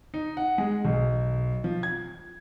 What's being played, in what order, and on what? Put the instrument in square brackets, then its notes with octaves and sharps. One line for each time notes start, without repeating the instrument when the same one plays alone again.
[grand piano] D#4
F#5
G#3
B1
F3
G#6